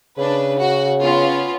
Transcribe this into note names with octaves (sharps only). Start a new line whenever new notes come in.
C#3 D4 B4
F#4
B3 C#4 F4